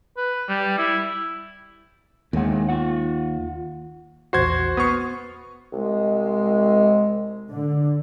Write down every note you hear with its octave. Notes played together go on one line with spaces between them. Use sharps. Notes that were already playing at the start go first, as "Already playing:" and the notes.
B4
G3
E4
D#2 B2 G#3 F#5
F4 F#5
A#1 E2 F#4 C5 G#6 C7
B3 C#6 D#6 F6 C7
C2 G#3
D3